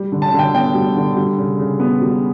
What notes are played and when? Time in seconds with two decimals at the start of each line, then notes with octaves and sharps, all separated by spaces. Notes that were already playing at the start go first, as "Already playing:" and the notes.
Already playing: G3
0.12 D3
0.22 A5
0.33 D3
0.39 G5
0.54 B3 G5
0.75 G3
0.96 D3
1.17 G3
1.38 C#3
1.59 C#3
1.80 B3
2.02 G3